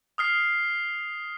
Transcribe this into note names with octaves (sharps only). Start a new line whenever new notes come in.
D#6 F6 C7